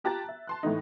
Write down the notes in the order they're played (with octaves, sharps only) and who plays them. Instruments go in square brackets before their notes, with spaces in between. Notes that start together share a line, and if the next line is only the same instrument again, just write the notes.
[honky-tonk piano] F4 G4 A5 A#5 F#6 A6
E5
A5 C6 F#6
A2 E3 A3 D#4